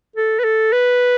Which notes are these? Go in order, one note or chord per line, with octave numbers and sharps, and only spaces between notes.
A4
B4
A4
B4